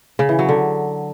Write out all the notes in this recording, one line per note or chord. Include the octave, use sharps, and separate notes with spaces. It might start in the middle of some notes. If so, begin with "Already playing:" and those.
C#3
E3
F#3
D3